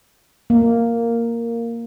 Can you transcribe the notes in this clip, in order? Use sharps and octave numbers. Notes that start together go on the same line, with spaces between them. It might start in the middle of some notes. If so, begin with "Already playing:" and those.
A#3